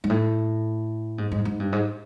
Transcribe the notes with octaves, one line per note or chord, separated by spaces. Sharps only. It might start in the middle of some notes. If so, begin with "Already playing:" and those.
G#2
A2
G#2
G#2
G#2
G2
G#2